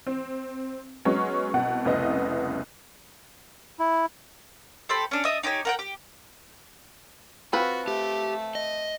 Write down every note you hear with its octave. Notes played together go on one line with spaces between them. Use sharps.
C4
F#3 G#3 B3 C#4
C2 B2 F#5
F1 C2 C#3 B3 E4 D#5
E4
G4 A4 C5 B5
C#4 D4
D4 D#5 E5 D#6
D#4 G4 C#5 G#5
A#4 F#5 G5
G4
C4 F4 F#4 B4
A3 G4
D#5